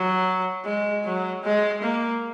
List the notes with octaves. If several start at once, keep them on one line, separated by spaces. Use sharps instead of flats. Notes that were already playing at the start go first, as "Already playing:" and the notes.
Already playing: F#3
G#3
F#3
G#3
A#3